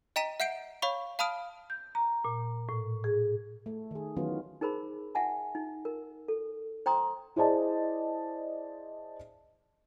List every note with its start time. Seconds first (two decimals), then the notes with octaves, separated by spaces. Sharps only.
0.16 D#5 G5 A#5 B6 D#7
0.40 E5 F#5 G6 C7 D7
0.82 C#5 F5 B5 C#6
1.19 F5 A5 B5 D#6 F6 D7
1.70 G6
1.95 A#5
2.25 A#2
2.69 A2
3.04 G#4
3.66 A3
3.91 D#3 G#4
4.16 D#3 E3 F#3 B3 C#4 F4
4.61 D#4 G#4 A#4 C5 B5
5.15 E5 F#5 G#5 A5
5.55 D#4
5.85 A#4
6.28 A4
6.86 C5 G5 A#5 C6 D#6
7.36 E4 G#4 C5 D5 D#5 A5